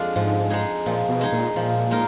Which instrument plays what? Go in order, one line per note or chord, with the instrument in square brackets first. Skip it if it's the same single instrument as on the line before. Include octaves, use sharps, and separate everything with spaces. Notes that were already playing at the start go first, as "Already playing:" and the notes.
Already playing: [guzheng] F2 G#3 D4 F4
[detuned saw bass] G#2 [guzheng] F3
[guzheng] G#3 D#4 G#4
[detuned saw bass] A#2 [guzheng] F3
[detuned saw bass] B2
[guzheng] G#3 D#4 G#4
[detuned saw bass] A#2
[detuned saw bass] A#2 [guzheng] F3
[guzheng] G#3 D#4 A#4